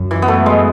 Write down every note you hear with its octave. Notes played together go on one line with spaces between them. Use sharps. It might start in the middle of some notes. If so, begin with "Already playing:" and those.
Already playing: F#2
E3
B3
A3
G#3